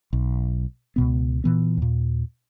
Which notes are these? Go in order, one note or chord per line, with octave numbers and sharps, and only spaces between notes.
B1
C#2 B2 B3
A#2 E3 B3
D#2 A#2